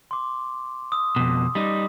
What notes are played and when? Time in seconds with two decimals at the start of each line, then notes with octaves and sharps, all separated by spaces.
0.11 C6 D6
0.92 D#6 E6
1.16 F2 B2
1.55 G3 D#4